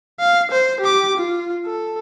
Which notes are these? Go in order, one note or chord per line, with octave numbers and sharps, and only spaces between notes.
F5
C5
G4 D6
F4
A4